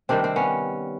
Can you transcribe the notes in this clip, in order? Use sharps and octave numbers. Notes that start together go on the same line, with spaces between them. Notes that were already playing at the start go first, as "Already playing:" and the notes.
C3 D#3 G3 C4 D4
C4
B3 C#4